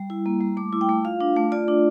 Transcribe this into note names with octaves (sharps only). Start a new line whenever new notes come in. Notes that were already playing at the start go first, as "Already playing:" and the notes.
Already playing: G3
E4
A#3
G3
A3 D6
E4
G5
A3
F4 F5
D4
A3
F4 D5
D4